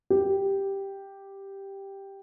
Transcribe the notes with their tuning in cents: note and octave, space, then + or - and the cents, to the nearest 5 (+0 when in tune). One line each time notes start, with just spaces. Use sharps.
G4 +0